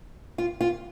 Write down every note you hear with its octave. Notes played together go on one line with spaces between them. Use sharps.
F4
F4